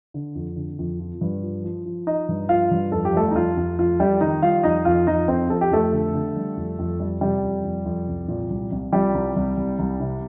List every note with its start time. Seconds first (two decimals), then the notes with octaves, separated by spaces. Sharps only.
0.14 D3
0.35 F2
0.56 D3
0.79 F2
1.00 F3
1.21 G2
1.43 F3
1.64 F3
1.85 F3
2.07 F3 D#4 D#5
2.29 G2
2.49 F3 F4 F5
2.71 G2
2.92 F2 A4
3.05 G4
3.14 G3 A3 A4
3.31 D#4
3.35 F2 F4
3.57 F2
3.79 F2 F4
4.00 F2 G3 G4
4.21 D#3 D#4 D#5
4.42 G3 F4 F5
4.64 F2 D#4 D#5
4.85 F2 F4 F5
5.07 F2 D#4 D#5
5.28 F2 C4 C5
5.50 F2 A4
5.61 G4
5.71 F2 A3 A4
5.92 D3
6.14 D3
6.36 G3
6.57 F2
6.79 F2
7.00 G3
7.21 C3 G3 G4
7.43 F2
7.64 F2
7.86 F2
8.08 C2
8.28 A#2
8.50 C2
8.72 C2
8.92 F3 G3 G4
9.14 C2
9.36 C2
9.57 C2
9.79 C2
10.00 C3